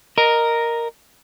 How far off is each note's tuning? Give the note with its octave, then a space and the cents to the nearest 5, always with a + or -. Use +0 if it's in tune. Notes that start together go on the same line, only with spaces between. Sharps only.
A#4 +0 D#5 -10